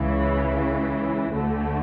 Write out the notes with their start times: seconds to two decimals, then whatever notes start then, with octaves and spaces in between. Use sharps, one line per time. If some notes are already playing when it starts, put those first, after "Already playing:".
Already playing: C#2 C#3 E3
1.34 D2 D3 A3